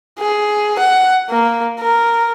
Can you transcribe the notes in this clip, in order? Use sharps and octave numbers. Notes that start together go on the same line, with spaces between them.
G#4
F#5
A#3
A#4